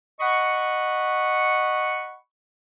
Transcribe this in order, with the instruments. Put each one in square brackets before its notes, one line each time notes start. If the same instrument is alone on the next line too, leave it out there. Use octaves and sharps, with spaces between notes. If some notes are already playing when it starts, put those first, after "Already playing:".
[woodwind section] D#5 F#5 B5 C#6